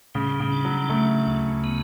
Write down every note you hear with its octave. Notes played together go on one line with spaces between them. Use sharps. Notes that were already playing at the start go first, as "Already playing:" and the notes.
C#3 G3
C#3
D4
F#3
C#3 A3
D2
B3